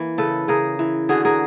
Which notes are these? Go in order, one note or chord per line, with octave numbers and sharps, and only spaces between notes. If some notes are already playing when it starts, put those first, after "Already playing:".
Already playing: E3 A#3
C#3 A4 B4
C#3 G#4 A#4
E3
D3 F#4 G#4
G#4 A#4